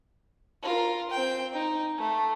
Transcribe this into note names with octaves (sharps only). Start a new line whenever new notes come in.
F4 A#4
C4 G5
D#4
A3